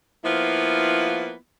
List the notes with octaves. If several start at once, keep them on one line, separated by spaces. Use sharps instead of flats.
F3 A#3 B3 E4 F4